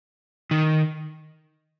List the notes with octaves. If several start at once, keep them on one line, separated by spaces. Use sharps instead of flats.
D#3